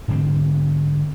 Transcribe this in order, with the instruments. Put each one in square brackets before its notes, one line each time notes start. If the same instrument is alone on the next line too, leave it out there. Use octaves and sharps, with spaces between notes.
[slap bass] G#2 D3 C4